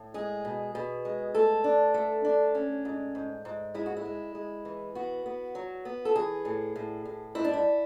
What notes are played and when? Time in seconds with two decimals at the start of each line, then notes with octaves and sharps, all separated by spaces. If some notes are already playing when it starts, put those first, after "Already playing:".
Already playing: A2
0.14 G#3 G#4
0.45 B2
0.75 B2
1.05 G#3
1.34 A3 A4
1.64 D4
1.94 A3
2.25 D4
2.55 C#4
2.85 G#2
3.15 G#2
3.45 G#2
3.75 G#3 E4
3.86 F#4
3.97 E4
4.05 G#3
4.35 G#3
4.65 E3
4.95 B3 F#4
5.26 B3
5.55 F#3
5.85 B3
6.05 A4
6.16 E3 G#4
6.45 A2
6.76 A2
7.05 A2
7.35 G#2 E4
7.44 D4
7.54 E4